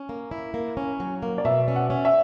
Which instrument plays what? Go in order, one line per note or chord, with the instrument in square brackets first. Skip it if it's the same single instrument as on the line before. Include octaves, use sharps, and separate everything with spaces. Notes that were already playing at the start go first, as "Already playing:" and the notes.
Already playing: [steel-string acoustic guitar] C#4
A#3
E4
A#3
C#4
F#3
A#3
[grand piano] D5
[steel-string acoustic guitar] B2 [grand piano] E5
[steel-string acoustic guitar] C#4
[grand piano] F#5
[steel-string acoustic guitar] C#4
[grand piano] E5